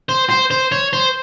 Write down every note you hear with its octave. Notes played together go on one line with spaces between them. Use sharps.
C5
C5
C5
C#5
C5